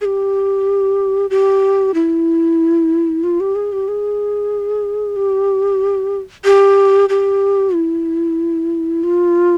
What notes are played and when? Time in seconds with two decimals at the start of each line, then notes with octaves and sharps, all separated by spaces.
0.01 G#4
0.05 G4
1.30 G4
1.94 E4
3.24 F4
3.40 G4
3.55 G#4
3.73 G4
3.88 G#4
5.16 G4
6.45 G4
7.09 G4
7.74 E4
9.03 F4